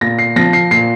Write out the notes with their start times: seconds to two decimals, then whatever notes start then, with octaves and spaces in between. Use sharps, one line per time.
0.01 A#2 A#6
0.19 C7
0.36 F3 A#6
0.53 C7
0.71 A#2 C7